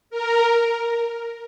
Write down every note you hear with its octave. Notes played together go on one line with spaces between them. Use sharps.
A#4